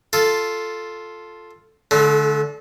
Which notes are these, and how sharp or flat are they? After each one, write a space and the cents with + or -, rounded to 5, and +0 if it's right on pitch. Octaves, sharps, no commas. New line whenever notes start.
F4 +0 A4 +0
D3 -15 A3 -45